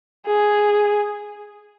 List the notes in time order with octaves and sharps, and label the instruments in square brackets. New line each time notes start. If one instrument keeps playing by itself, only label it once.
[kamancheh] G#4